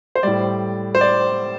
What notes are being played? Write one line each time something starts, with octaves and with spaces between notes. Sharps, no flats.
C5
A2 G3 D5
C5
D5